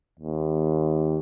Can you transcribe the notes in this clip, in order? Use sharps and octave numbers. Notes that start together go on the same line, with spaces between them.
D#2